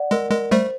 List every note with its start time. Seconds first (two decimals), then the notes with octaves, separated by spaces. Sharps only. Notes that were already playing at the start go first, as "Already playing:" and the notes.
Already playing: D5 F#5
0.11 G#3 A#4
0.31 G#3 A#4
0.51 G3 A3 C5